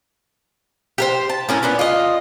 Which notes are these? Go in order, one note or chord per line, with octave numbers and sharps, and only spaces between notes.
G4 A#4 C5
A5
A2 C#4 A#4
A#2 B3 C#4
F4 D#5